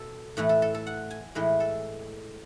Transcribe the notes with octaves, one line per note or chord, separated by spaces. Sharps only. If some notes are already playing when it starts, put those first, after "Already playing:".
Already playing: B2 A4
A2 E3 A3 B4
A4
A4
A4
F#5
G#5
A2 E3 G#3 B4
A4